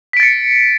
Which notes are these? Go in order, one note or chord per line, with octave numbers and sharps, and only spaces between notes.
A6 B6 C#7 D7